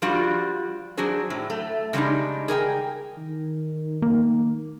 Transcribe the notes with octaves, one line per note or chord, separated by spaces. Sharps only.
F3 G3 D4 F4 F#4
F#3 D4 F#4 G#4 C5
A2 F#3
A3
C#3 G3 G#3 D4 D#4
G#4 A#4 D5 G5
D#3
A#3